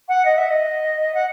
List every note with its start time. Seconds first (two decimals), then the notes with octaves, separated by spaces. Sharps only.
0.08 F#5
0.25 D#5
0.38 E5
0.50 D#5
1.14 F#5